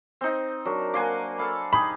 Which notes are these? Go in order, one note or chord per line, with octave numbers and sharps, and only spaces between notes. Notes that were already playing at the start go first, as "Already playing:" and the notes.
C4 D#4
F#3 D4 A#4
A#3 F#4 F#5 G#5 C6 D6
A4 F5 B5
D#4 G4 G#4 B5